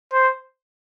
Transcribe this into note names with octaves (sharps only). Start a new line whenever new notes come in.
C5